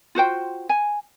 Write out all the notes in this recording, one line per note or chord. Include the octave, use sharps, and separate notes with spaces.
F4 F#4 C5 G5
G#5